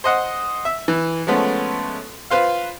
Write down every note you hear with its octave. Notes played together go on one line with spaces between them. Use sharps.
C5 D#5 F#5
E5
E3
F3 G#3 A3 B3 C#4
F4 B4 C5 F5